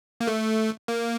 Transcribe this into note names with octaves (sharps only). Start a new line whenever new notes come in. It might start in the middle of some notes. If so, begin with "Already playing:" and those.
A#3
A3
A#3